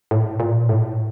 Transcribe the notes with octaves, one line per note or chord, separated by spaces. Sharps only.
A2
A#2
A2